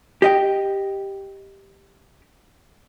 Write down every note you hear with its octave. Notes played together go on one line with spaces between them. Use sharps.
G4 D#5 G5